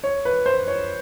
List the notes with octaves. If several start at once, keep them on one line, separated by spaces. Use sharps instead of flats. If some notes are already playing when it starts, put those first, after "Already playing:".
C#5
B4
C5
C#5